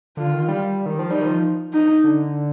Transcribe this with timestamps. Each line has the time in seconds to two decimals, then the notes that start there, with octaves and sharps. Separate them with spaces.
0.17 D3 F4
0.33 D#3
0.48 G3
0.86 D#3
0.99 F3
1.11 G3 D#4
1.21 D#3
1.26 F3
1.73 D#4
2.04 D3